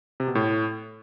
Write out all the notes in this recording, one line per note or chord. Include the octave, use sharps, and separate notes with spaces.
C3
B2
A2